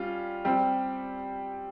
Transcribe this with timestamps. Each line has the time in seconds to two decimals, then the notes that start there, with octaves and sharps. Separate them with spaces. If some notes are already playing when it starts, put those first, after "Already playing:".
Already playing: G3 C#4 F4
0.45 G3 C4 G4